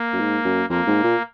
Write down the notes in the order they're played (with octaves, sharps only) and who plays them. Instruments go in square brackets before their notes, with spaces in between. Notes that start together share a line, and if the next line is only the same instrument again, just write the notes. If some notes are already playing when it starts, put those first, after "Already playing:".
Already playing: [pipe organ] A#3
[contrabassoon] F#2
G#2
F#2
[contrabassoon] F2 [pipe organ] A#3
[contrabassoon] G#2
A#2